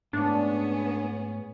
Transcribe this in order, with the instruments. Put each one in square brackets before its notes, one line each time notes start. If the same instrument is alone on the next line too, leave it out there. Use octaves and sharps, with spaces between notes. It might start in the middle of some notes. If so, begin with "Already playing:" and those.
[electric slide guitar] G#2 A3 [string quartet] B3 C#4 G#4 [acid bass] D4